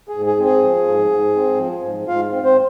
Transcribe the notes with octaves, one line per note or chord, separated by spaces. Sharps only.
G#4
G#2
G#4
C4
G#4
F3
G#2
G#2
C4
F3
G#2
G#2 F4 F5
C4
C4 C5